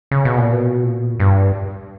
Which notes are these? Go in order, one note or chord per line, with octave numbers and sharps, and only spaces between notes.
C#3
B2
A#2
B2
A#2
G2